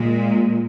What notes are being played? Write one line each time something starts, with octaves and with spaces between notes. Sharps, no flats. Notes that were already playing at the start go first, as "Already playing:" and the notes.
Already playing: A#2 G#3